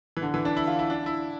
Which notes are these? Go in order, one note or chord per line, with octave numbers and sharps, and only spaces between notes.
E3
D3
E3
D4
E4
F4
E4
D4
E4